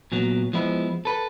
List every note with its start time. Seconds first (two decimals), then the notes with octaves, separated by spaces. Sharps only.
0.12 A#2 F#3 B3
0.53 F3 G#3 B3 E4
1.05 A4 B4